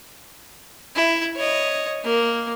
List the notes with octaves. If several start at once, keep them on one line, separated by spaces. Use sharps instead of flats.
E4
C#5 D#5
A#3